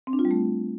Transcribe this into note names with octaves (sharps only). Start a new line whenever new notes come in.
C4
D4
F4
G3
A3